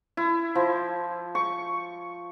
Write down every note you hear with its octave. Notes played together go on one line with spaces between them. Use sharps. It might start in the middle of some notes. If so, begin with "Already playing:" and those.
E4
F3
C#6